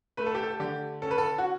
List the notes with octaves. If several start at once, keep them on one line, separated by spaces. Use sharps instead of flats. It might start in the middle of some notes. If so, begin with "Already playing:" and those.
A3 B4
A4
G4
A4
D3 G4
C#4 A4
B4
A4
F#4